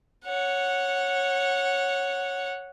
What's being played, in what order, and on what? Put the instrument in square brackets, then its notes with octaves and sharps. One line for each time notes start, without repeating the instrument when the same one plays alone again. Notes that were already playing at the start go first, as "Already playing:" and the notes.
[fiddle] C#5 F#5